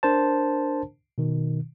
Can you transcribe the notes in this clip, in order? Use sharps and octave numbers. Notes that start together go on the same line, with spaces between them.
D4 A#4 C5 A5
B2 D#3